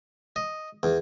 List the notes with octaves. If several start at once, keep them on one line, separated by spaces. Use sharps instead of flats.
D#5
E2